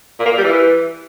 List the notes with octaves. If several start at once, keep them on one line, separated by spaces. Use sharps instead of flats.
A#2
A#3
A#2
G3
E3